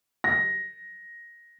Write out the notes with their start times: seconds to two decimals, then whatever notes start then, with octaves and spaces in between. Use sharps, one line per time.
0.24 A#6